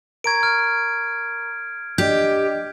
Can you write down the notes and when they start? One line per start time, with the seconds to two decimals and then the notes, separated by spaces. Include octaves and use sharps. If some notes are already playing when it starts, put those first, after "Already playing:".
0.24 A#4 A#5 C#6 G#6 D7
0.43 F6 D7
1.98 D4 G4 D5 D#5 G6